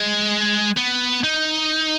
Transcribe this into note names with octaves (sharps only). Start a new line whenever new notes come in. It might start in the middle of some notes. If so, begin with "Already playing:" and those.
Already playing: G#3
B3
D#4